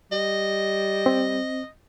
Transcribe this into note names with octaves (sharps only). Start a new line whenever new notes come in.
G3 D#5
C4